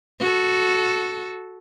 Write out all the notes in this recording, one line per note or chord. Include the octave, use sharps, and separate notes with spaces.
F#4 A4